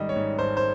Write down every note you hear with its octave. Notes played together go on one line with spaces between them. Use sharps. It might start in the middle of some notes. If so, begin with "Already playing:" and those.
Already playing: G#1 D#3 G3 D#5
C#5
G#2
G#1 C5
C5